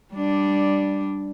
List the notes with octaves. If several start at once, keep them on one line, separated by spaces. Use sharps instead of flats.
G3 D4